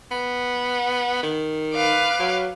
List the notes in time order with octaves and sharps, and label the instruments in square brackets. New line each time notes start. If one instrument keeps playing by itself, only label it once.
[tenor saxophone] B3
D#3
[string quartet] B4 F5 D6
[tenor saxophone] F#3